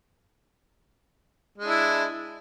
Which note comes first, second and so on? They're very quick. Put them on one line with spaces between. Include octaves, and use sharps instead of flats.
G#3 D4 E4